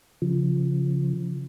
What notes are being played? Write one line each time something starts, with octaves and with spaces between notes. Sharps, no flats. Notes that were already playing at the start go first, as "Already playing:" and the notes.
C#3 F3